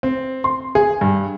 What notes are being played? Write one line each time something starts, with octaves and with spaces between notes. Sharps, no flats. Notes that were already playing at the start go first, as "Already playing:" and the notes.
C4
C6
G#4
G2